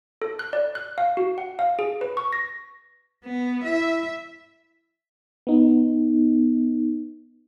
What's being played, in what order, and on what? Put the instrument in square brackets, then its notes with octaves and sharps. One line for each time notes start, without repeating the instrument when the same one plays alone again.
[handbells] A4
F#6
D5
F#6
F5
F#4
F#5
F5
G#4
B4
C#6
A#6
[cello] B3
[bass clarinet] E4 [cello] E5
[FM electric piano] B3 D#4